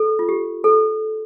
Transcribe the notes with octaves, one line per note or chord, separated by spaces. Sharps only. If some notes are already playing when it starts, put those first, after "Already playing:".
Already playing: A4
F4
G4
A4